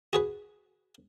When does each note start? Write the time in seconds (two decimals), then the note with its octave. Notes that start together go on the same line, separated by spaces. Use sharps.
0.13 F#4 G#4 B4